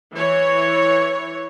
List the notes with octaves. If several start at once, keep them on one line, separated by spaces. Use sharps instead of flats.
E3 C#5